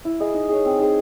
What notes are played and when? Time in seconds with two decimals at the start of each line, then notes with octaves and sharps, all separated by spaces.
0.05 E4
0.20 G#4 D#5
0.34 D#4
0.49 G#4 C#5
0.65 C4
0.79 D#4 G#4 C5